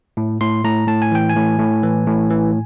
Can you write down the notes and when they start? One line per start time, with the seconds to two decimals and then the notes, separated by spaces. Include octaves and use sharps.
0.17 A2
0.41 A2 C6
0.64 A2 A#5
0.87 A2 A5
1.02 G#5
1.12 E3 G5
1.29 G#5
1.36 A2
1.59 A2
1.83 E3
2.07 A2
2.30 E3